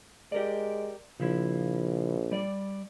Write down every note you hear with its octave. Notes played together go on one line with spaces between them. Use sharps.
G#3 G4 A#4 D5
A#1 C#3 F3 E4
G3 D5